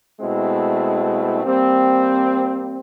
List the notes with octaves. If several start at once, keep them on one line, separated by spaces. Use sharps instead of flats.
B2 G#3 A3 C4 E4
G3 A#3 C4